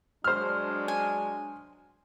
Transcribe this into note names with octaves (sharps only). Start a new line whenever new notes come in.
F#3 G#3 D4 C5 F6
G#5